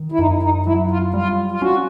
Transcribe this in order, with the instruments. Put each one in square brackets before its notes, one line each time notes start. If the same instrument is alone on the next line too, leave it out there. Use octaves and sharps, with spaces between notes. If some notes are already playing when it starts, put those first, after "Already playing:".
Already playing: [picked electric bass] D#3
[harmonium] E4
[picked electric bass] F#2 [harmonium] D#4
[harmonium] D#4
[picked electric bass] F#3 [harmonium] E4
[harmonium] F4
[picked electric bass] G3 [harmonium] F4
[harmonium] F4
[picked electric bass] C#4 [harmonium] F#4